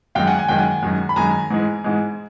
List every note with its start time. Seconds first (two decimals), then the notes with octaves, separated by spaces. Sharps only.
0.15 F#2 D#3 G#3 F5 G5
0.27 F#5 G#5
0.38 G#5
0.48 F#2 D#3 G#3 G5
0.58 F#5 G#5
0.83 F#2 D#3 G#3
1.09 B5
1.16 F#2 D#3 G#3 G#5 A#5
1.50 G#2 E3 G#3
1.84 G#2 E3 G#3